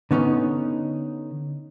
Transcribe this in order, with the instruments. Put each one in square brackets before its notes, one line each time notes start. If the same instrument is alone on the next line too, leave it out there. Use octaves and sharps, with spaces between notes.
[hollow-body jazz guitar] D3 B3 C#4 D#4